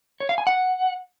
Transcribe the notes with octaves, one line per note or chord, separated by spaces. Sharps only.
C#5
F5
G#5
F#5